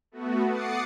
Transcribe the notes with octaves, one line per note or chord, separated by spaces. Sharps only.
A3 B3 F#4
F#5 D6 D#6 A6 C7 C#7